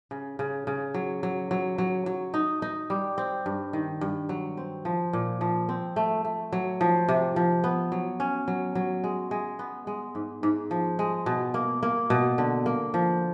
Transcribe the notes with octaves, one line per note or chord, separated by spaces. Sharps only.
C#3
C#3
C#3
F#3
F#3
F#3
F#3
F#3
D#4
D#4
G3
C4
G2
D#3
G2
F#3
C4
F3
A#2
F3
C4
A3
A3
F#3
F3
C3
F3
B3
F#3
C#4
F#3
F#3
G#3
G#3
B3
G#3
G#2
G#2
F3
G#3
B2
A#3
A#3
B2
D3
A#3
F3